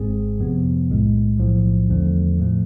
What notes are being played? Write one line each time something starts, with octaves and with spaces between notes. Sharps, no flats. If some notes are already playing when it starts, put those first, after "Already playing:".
Already playing: G#1 G#2 G#3 C4 G#4
F2 C3 F3 B3
B1 A2 G#3
B1 A2 F3
E2 D3 F3 A3
A2 F3 A3